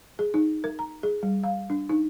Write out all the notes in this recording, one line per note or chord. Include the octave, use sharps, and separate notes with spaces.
G#4
D#4
A#4
A#5
G#4
G3
F5
D4
D#4